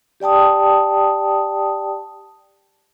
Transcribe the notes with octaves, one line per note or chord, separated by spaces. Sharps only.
G4 D5 G5 A5 D#6